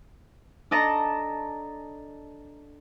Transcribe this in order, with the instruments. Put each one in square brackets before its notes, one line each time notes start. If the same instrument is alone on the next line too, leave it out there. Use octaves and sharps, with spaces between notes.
[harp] D4 A4 D#5 A5 A#5